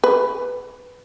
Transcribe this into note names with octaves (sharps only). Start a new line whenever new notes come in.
B4